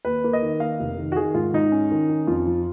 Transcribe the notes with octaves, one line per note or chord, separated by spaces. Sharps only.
D#2 B4
A#3
D#5
D#3
A#3 F5
F1
D#3
F#4
D#3 G#4
G#2 F4
G#2 D#4
C#4
D#3
C#4
F2 F4
F3